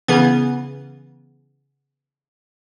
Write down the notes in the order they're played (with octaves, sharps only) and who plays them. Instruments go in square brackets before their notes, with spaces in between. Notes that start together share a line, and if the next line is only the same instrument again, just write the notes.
[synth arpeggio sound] C#3 E3 B3